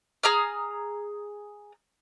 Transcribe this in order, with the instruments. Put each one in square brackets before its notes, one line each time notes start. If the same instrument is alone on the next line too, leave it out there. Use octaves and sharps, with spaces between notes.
[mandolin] G#4 A#5 D#6 F6